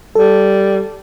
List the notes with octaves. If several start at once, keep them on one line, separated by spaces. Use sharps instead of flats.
G3 A4